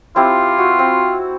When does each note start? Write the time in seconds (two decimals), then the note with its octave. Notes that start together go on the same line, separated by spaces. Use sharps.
0.16 C4 E4 F4 G4
0.58 F#4
0.79 C4